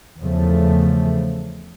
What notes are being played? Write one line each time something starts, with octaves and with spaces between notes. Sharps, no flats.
E2 C#3 F3 A3